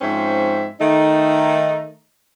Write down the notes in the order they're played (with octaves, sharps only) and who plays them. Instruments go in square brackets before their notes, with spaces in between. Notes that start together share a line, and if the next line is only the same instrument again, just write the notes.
[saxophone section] G#2 F3 C4 C#4 C5 E5
D#3 A3 D#4